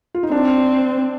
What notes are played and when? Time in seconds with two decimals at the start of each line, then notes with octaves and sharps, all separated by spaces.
0.15 F4
0.23 D#4
0.32 C4 D4